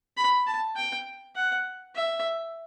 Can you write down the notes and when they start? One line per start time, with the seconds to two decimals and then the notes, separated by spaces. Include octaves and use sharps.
0.17 B5
0.47 A5
0.76 G5
1.36 F#5
1.95 E5